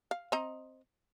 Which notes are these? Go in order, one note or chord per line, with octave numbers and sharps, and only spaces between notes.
F5
C4 D#5 A#5